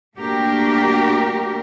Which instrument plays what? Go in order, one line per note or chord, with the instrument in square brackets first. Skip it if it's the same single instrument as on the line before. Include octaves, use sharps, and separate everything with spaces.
[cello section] A3 A#3 D4 F#4 G4 A#4